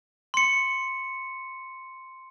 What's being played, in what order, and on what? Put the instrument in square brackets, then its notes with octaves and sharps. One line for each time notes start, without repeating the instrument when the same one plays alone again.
[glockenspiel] C6 C#7